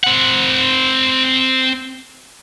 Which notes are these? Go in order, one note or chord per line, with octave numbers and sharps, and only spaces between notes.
C4 F#5